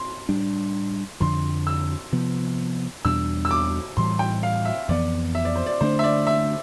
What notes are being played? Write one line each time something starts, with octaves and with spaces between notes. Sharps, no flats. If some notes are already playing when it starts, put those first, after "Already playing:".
Already playing: C6
A2 G3 D4
F2 D3 F3 C6
E6
C3 F3 B3
E2 B2 G3 D4 E6
E6
D6
A2 E3 G3 C6
G5
F5
E5
F2 E3 B3 D5
E5
D5
C5
D5
D3 A3 D4 C5
E5
D5
E5